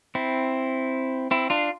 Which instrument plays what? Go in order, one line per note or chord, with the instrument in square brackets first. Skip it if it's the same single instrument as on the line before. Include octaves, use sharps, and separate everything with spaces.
[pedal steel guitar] C4 E4
C4 E4
D4 F4